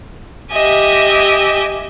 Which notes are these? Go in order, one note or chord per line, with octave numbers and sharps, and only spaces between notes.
G4 D#5 E5 G#5